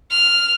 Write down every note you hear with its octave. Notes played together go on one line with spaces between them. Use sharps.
F6